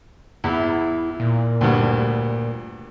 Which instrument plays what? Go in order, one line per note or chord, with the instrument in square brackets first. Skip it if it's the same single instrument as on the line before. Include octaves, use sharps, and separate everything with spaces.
[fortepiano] E2 [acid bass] E4
[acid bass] A#2
[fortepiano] D2 G2